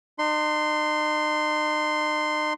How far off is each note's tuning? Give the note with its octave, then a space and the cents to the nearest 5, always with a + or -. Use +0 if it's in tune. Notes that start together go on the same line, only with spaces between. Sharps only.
D#4 -40 C6 -5